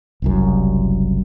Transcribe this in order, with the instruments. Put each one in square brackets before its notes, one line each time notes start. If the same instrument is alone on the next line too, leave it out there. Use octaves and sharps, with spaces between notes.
[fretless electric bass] F#1 C2 F#2